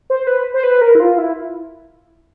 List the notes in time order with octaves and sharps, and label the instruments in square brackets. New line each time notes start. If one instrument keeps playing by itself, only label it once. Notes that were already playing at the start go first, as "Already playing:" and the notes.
[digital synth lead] C5
B4
C5
B4
A#4
E4
F4
E4